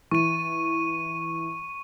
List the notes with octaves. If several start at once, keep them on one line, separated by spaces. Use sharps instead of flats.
E3 C#6 D#7